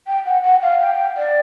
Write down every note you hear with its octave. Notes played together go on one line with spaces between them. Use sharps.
G5
F#5
F#5
F5
G5
D5